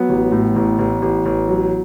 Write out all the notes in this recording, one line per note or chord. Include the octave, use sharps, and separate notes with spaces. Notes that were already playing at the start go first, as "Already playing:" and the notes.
Already playing: F#3 B3
A1
A2
A1
A1
A1
A1
F#3